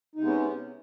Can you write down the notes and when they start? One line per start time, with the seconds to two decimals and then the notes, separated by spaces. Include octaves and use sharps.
0.16 D#4
0.18 C3
0.21 G#3
0.24 B3
0.27 C#4